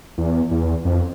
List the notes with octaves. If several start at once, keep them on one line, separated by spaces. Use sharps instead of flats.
E2
E2
F2